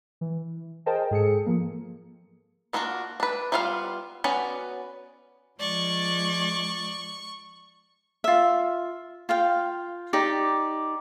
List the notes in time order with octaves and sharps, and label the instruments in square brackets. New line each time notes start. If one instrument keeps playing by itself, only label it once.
[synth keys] E3
G#4 A#4 C5 D#5 G5 A5
G#2 G#4 A4 C#7
F3 A#3
[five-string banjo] A#3 B3 D4 F4 F#4
D4 B4
G3 B3 F4 C#5 F5
B3 C#4 F#4 D5
[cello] F3 G#3 [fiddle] D5 [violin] C#6
[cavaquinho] F4 E5
F4 F5 G5
D#4 G4 D5